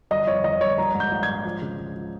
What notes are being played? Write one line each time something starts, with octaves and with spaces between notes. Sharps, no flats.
G1 D#5
F2 C#5
F2 D#5
G1 C#5
A#1 A#5
G#2
G6
A#1
G#6
G#2
F3
C#3
C#2
F3